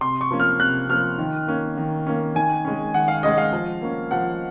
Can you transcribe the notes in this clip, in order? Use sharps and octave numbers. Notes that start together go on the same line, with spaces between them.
C3 C6
C#6
F3 A#3 C#4
F6
C3 F#6
F3 A#3 C#4 F6
D#3
A#3 C#4
D#3
A#3 C#4
D#3 G#5
G#3 C#4
D#3 F#5
F5
G#3 C#4 D#5
F5
F3
A#3 C#4
F3 F#5